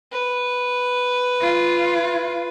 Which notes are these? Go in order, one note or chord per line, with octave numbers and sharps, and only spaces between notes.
B4
F4